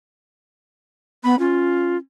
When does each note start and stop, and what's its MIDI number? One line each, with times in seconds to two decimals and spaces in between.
1.24 1.35 59
1.24 1.39 83
1.39 1.95 61
1.39 1.97 65